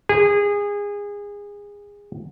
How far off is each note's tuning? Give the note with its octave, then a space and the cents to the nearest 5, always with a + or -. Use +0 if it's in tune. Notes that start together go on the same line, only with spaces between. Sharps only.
G#4 -25